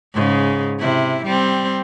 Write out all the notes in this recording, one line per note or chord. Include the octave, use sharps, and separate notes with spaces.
G#2 C#3
C3 E4
G3 C4